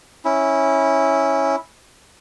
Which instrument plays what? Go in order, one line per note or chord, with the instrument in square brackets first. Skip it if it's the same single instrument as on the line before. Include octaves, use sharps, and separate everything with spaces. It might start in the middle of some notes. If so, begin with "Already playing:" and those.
[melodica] C#4 E4